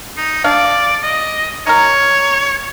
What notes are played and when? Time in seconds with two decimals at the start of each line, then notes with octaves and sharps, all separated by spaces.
0.17 D#4
0.44 D4 D5 F5
1.03 D#5
1.67 D#4 A#4 C#5